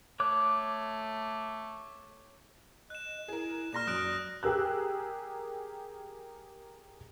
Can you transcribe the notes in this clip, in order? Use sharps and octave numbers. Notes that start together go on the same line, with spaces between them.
A3 C#5 D6 F#6
D#5 F#6 E7
E4 G#4 A#4
A#2 D5 A#5 C6 F6 A#6 E7
F#2 D#6 F#6 D7
G4 G#4 A#4 E6 F#6